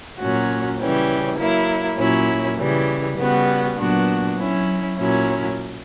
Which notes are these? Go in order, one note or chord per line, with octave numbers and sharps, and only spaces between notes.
A#2 F#3 C#4 F#4
C#3 E3 G3 C#4
F#3 A#3 E4
A#2 F#3 C#4 E4
C#3 E3 G3
C#3 G3 B3 F#4
A#2 F#3 B3 D4 F#4
F#3 C#4 E4
A#2 F#3 C#4 E4